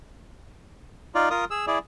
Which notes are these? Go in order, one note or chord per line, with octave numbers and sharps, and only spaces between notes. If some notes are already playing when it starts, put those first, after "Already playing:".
D#4 F4 D5
F4 A#4 D#6
G#4 E6
E4 G#4 D5